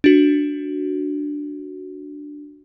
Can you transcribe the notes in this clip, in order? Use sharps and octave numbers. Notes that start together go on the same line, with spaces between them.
D4 F#4